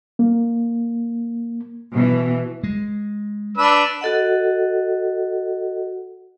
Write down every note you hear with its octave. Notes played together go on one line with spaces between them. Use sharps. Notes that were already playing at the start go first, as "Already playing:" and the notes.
A#3
B2 E3
G#3
D4 B4 E6
F#4 A4 D#5 F#5